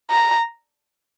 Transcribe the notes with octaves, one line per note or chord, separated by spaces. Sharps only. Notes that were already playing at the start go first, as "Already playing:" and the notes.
A#5